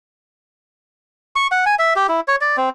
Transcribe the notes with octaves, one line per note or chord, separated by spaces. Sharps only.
C#6
F#5
G#5
E5
G4
E4
C#5
D5
C4